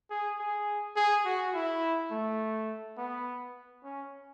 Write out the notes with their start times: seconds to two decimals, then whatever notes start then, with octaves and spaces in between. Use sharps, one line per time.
0.10 G#4
0.40 G#4
0.96 G#4
1.25 F#4
1.55 E4
2.11 A3
2.98 B3
3.84 C#4